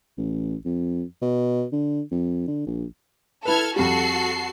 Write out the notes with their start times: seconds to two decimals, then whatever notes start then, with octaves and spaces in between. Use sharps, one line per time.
0.18 A1
0.65 F2
1.22 B2
1.72 D3
2.12 F2
2.48 D3
2.67 A#1
3.45 E4 A4 B4 F6 G#6
3.76 F2 G3 F#4 A4 C7